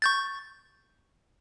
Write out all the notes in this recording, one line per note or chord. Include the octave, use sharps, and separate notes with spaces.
C#6 G6 A6